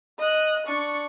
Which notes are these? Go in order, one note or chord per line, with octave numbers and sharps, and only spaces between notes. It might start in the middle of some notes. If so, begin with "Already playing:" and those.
D#5 F#6
D4 C#6